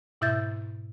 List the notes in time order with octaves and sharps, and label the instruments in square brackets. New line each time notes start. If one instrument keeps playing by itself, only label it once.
[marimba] G#2 B2 E4 E5 G6 A6